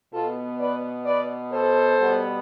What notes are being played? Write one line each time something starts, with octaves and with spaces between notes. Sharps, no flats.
B2 B3 F4 A4
B4 D5
B4 D5
A4 C5
B2 G3 B3